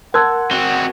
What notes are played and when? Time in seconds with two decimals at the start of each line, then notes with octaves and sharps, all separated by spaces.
0.14 A#4 F#5 A5 C6 E6 F#6 G#6
0.51 C4 F#4 G7